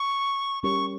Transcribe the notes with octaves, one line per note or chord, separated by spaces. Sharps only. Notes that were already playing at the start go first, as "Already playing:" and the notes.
Already playing: C#6
G3 C#4 G4 A#4 C#5 C#6